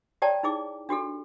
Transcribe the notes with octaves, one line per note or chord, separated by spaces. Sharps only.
G4 C#5 D5 G5 A5 A#5
D#4 E4 G#4 D6
D4 F#4 G4 A4